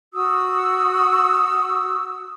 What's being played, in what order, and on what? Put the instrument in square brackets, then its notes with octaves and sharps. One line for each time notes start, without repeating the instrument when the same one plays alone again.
[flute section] F#4 D#6 E6